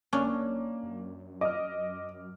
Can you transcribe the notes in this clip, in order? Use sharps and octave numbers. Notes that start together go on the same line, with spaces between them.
F#1 A#3 C#4 D4
F#2
D#5 D6 F6